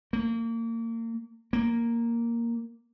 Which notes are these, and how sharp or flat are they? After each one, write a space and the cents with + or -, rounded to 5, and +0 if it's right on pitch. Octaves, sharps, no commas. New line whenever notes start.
A#3 -30
A#3 +0